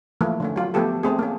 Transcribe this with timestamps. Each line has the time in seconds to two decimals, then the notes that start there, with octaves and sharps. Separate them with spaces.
0.21 E3 F3 A3 A#3 E4
0.40 D3 A3 C#4
0.56 F#3 F4
0.74 F3 A3 B3 G4 A4
1.03 A3 C4 G#4
1.19 A#3 C#4